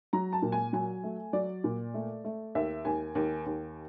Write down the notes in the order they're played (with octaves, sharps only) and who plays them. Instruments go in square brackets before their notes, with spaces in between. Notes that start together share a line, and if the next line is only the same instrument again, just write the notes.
[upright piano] F#3 A#5
A5
A#2
G#5
F#3 G#5
A3
F#3 D5
A#2
A3
A3
D#2 E5
D#2 G#5
D#2
D#2